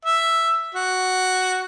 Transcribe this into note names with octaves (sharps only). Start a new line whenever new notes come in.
E5
F#4